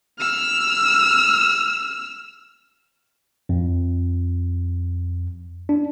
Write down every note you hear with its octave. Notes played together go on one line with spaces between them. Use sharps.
E6 F6
F2
D4